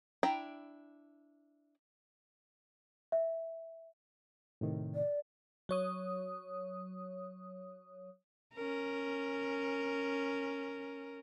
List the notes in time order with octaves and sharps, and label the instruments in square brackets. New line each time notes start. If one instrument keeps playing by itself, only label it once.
[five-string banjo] D4 E4 G5 A#5
[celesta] E5
[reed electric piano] A2 C3 D#3
[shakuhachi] D5
[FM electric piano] F#3 C#5 D#6
[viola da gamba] C#4 A#4